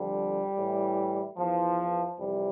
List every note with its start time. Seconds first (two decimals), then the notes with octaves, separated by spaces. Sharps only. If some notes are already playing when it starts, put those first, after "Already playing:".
Already playing: F2 D3 F3 G3
0.58 A2 E3
1.37 E2 E3 F3
2.18 F2 C3 E3 G3